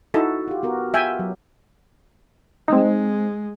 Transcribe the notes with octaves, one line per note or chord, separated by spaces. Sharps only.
D#4 E4 F#4 A4
F4 G4
B3 F#4 A#4
F4 E5 G5 G#5
F#3
G#3 C4 D#4